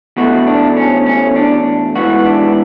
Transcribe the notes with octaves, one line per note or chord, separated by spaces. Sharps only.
E2 B2 A3 F#4
D4
C#4
C#4
D4
G#2 E3 B3 F#4
D4